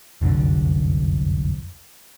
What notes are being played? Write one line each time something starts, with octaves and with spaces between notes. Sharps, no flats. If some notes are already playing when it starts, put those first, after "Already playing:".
F1 C2 F#2 D3